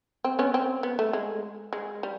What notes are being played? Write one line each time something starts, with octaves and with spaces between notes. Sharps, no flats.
C4
B3 C#4
C4
B3
A3
G#3
G#3
G3